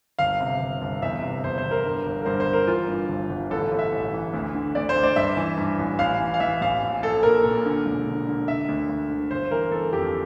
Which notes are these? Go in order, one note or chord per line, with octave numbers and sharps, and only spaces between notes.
G1 F5
C3
G1
G1
E2 E5
C3
E2 C5
C5
E2
A#4
G2
G1
A#4
G2 C5
C5
G1
A#4
E3 F4
G2
G1
G1
A1 A4
A1
E5
A1
E3
D2
D3
D2 D5
C5
D2
D5
G2 E5
E3
G2
A1
A1 F5
E3
F5
E3 E5
A1 F5
A#1
A#1 A4
A#2 A#4
A#2
D3
E1
D3
D3
D3 E5
D2
D2
D3
G1 C5
E3 A#4
E3 A4
F2 G4